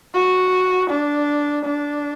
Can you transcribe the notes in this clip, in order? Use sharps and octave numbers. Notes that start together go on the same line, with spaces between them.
F#4
D4
D4